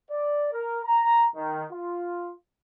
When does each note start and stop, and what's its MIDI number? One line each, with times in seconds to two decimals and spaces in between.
0.10 0.48 74
0.52 0.79 70
0.83 1.27 82
1.35 1.63 51
1.72 2.32 65